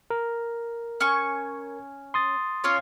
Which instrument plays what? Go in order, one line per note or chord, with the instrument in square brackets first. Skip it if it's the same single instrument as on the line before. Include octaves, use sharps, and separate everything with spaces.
[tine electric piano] A#4
[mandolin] C#4 G#5 C#6
[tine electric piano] C6 D#6 A6
[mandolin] C#4 F4 C#5